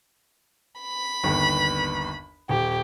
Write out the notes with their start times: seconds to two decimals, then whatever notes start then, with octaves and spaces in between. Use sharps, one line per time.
0.81 B5
1.24 G1 D#2 B3
2.49 D#1 G4